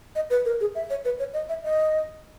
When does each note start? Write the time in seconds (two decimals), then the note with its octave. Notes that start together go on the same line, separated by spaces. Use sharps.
0.15 D#5
0.30 B4
0.45 A#4
0.61 G#4
0.75 E5
0.90 C#5
1.05 B4
1.19 C#5
1.34 D#5
1.49 E5
1.63 D#5